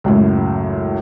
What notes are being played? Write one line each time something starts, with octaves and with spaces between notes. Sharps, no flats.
C#2 F#2 A2